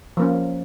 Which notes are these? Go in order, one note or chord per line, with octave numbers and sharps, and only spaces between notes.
F3 A#3 C#4